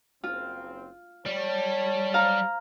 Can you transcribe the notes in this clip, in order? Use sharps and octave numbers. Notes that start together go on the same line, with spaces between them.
F#1 C4 F4
G3 C#5 A5
F5 A#5